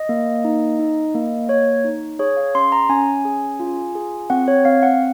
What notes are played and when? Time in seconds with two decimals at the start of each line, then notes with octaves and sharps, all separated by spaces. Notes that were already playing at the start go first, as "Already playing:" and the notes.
Already playing: D#5
0.09 A#3
0.45 D#4
0.79 D#4
1.14 A#3
1.49 A#3 C#5
1.85 D#4
2.19 G#4 C#5
2.37 F5
2.55 C#4 C6
2.72 A#5
2.89 C#4 G#5
3.25 G#4
3.60 F4
3.95 G#4
4.30 C4 F#5
4.48 C#5
4.65 C4 F5
4.83 F#5